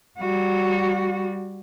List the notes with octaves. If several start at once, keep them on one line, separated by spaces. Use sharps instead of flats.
G3 F#4